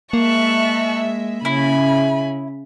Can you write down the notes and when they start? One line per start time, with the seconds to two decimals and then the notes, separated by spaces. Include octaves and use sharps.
0.13 G#3 A#3 E5 A5 C#6 F#6
1.45 C#3 E4 G#5 B5